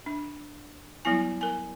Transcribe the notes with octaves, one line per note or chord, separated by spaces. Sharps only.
D4
F#3 G3 B3 E4 G#5
A#4 G#5